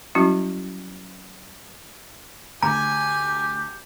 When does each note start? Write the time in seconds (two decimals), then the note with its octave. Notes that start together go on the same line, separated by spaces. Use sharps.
0.15 F#3 G3 C#4 E4 F#4
2.63 D2 G4 G#5 A#5